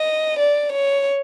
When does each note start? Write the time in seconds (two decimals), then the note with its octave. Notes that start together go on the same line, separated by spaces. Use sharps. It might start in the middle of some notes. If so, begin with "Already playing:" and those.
Already playing: D#5
0.39 D5
0.72 C#5